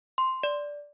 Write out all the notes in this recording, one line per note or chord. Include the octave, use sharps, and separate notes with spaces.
C6
D5